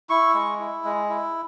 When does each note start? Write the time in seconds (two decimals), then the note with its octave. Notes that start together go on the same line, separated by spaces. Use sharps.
0.10 E4 C#6
0.34 G#3
0.59 E4
0.84 G#3
1.09 E4